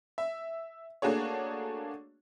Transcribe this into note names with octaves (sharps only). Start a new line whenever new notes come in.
E5
A3 A#3 D4 F#4 G#4 C#5